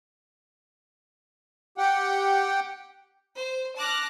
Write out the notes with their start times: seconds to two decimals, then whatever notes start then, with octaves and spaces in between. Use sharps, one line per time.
1.78 G4 F#5 G5
3.36 C5
3.78 A5 D6 F6 F#6 A#6